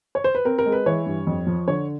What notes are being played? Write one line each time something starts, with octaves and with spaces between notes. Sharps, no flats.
C#5
C5
B4
C4 A#4
A#4
G#3
B4
E3 C#5
G2
F2
F3
D3 C#5